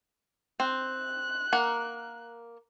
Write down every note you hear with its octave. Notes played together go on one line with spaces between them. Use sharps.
C4 F#6
A#3 A#4 F#5